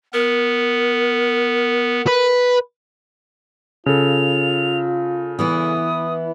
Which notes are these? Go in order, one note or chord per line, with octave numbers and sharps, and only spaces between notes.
B3 A#4
B4
C#3 F4 A4 F7
E3 B3 E4 D#6